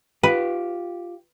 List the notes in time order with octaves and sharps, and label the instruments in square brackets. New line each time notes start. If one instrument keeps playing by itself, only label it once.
[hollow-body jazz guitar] F4 G4 [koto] B4